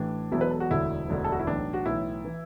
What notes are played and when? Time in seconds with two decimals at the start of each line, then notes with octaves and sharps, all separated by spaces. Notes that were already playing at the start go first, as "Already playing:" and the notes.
Already playing: A1 A2 E3 D4
0.31 E1 E2 B2 F#3 E4
0.41 B4
0.51 A4
0.60 F#4
0.71 E1 D2 D3 F#3 E4
1.08 E1 D2 D3 F#3
1.25 A4
1.32 F#4
1.39 E4
1.47 B1 A2 E3 D4
1.73 F#4
1.86 B1 A2 E3 E4
2.25 E3